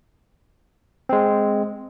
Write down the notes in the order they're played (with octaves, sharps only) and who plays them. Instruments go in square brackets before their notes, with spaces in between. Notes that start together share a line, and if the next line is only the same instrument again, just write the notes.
[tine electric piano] G#3 C4